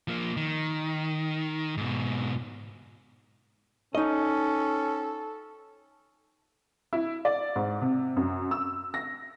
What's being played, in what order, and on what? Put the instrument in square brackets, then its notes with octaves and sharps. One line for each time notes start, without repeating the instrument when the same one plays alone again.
[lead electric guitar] F3 A#3
D#3
G#2 B2
[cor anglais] C#4 [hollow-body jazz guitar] D#4 D#5 [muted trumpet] A4
[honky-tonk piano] E4
D5
G#2
C3
F#2
E6
A#6